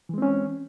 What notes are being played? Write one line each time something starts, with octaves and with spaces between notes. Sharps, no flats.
E3 G#3 C4 C#4